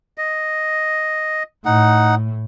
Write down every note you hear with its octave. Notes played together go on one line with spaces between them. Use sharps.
D#5
A2 D#4 F#5